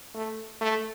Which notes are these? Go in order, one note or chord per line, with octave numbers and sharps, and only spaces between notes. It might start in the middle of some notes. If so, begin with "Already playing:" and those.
A3
A3